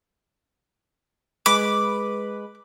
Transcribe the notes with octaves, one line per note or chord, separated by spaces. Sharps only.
G#3 B4 B5 D6